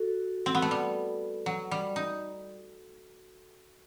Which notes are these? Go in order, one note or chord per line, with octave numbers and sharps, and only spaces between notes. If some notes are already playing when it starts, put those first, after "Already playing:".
Already playing: F#4 A4
C4
B3
A3
G3
F#3
G3
D#4